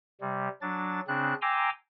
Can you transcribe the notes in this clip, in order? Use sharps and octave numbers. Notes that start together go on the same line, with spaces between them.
C3 G3
F#3 D4 A6
C#3 C4 D4 F#6
G5 G#5 A#5 C6 D6 E6